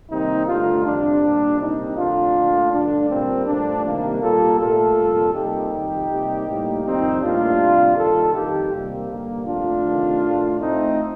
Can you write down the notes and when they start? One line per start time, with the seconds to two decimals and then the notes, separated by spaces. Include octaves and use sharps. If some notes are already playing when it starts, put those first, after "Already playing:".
0.11 C3 D#3 G3 A#3 C4 D#4
0.47 G2 D3 A3 D4 F4
0.85 F2 C3 G3 D4
1.22 A#2 G3 A#3
1.60 C3 G3 A#3 C4 D#4
1.97 F2 D3 A3 D4 F4
2.35 A#2 A3
2.73 G2 D3 A3 D4
3.10 A#2 G3 A#3 C4
3.47 G2 F3 A3 D4
3.85 C3 D#3 G3 A#3
4.22 A#2 G3 A#3 F4 A4
4.60 A#2 A3 F4 A4
4.97 F2 C3 G3 A#3
5.34 C3 G3 A#3 D#4 G4
5.73 F2 D#3 G3
6.10 C3 G3 A#3
6.47 A2 G3 A#3
6.84 F2 D#3 G3 C4 D#4
7.22 A2 G3 A#3 D4 F4
7.60 C3 G3 A#3
7.97 G2 D#3 A#3 F4 A4
8.34 F2 D#3 G3 D#4 G4
8.72 C3 G3 A#3
9.09 G2 D3 G3 A#3
9.47 F2 D3 F3 A3 D4 F4
9.84 C3 D#3 A3
10.23 A2 A3
10.59 A2 A3 C4 D#4